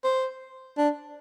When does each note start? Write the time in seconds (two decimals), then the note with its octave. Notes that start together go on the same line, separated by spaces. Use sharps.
0.04 C5
0.78 D4